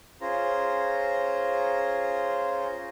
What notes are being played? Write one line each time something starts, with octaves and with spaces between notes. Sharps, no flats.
C#4 F4 G#4 C5 A#5